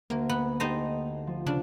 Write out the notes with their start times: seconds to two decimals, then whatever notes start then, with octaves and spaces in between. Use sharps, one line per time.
0.10 D2 A#3 A#4
0.29 B3
0.60 D#4 G4 A4 C5 D#5
1.27 F3
1.47 C#3 D4